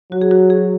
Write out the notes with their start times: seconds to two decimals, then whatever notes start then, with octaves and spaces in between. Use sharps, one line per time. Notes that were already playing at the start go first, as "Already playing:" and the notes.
0.12 F#3 F#4
0.22 G#4
0.31 F#4
0.50 G#4